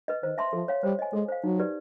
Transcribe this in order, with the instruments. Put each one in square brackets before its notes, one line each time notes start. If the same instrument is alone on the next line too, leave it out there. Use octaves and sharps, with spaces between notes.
[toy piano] B4 D#5
[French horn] D#3 [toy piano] C5
[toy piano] E5 A5 C6
[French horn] F3 [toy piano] A4
[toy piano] C#5 F5
[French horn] G3 [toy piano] C5
[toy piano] D#5 G#5
[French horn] G#3 [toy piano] A4
[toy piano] C5 F5
[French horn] F#3 [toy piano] D#4
[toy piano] G4 B4 D5